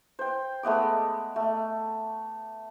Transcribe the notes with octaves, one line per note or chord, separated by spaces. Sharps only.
C5 G5
G#3 A3 B3 D6
A3